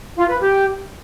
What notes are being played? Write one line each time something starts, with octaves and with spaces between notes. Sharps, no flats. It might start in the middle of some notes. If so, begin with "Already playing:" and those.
F4
B4
G4